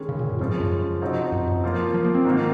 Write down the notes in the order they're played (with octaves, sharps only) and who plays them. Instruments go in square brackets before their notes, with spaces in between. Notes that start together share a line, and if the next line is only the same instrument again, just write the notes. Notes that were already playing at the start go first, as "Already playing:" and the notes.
Already playing: [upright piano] D#3 G#3 C#4 G#4
[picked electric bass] C#3
A#2
F#2
[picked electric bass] G#2 [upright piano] C#3 F3 G#3 C#4
[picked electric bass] F#2
[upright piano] C3 F3 C4 D#4 F#4
[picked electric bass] F#2
F#2
[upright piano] F3 A#3 F4
[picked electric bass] F3
A#3
C4
[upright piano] G#2 D#3 A#3